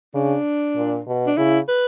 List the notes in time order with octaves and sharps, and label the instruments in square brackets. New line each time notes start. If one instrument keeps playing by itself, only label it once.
[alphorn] C#3 [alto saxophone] D4
[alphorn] A#2
B2
[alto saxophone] D4
[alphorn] C#3 [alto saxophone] E4
[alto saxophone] B4